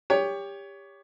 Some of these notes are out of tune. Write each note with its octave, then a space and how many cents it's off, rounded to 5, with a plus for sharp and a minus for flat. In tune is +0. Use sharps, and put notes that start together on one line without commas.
G4 +25 C#5 +20